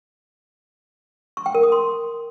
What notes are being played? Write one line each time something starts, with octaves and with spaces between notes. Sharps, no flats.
C#6
G5
A#4
D#6
C6